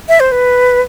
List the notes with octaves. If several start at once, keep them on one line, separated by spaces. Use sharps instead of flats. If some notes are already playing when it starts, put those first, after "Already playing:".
E5
C5
B4